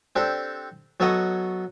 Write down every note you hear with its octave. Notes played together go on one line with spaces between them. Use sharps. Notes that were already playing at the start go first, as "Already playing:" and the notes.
C4 D4 G4 A4
F#3 B3 A4 C#5 D#5 F#5